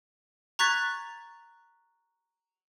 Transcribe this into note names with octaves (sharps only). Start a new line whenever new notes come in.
A#5 C#6 F#6 G#6 A6 B6